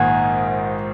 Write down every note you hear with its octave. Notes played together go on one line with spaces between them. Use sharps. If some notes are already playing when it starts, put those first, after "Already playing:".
Already playing: A#1 G#2 D#3 A#3 F#5 G#5